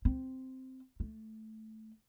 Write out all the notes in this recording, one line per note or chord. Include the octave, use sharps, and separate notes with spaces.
C4
A3